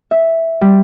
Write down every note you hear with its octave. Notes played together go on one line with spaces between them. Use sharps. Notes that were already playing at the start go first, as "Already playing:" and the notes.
E5
G3